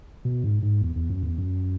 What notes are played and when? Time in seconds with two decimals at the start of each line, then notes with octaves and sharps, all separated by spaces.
0.25 B2
0.44 G#2
0.62 G#2
0.81 E2
0.96 E2
1.10 F#2
1.23 E2
1.38 F#2